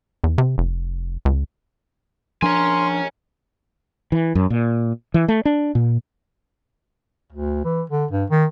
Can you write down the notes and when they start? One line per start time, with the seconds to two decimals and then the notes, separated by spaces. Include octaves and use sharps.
0.24 E2
0.38 C3
0.58 F1
1.25 C#2
2.42 F3 D4 A#4 C#5 G#5 C6
4.12 E3
4.35 F#2
4.50 A#2
5.14 E3
5.28 A3
5.45 D4
5.75 A#2
7.32 D2
7.65 E3
7.90 D3
8.11 G2
8.30 D#3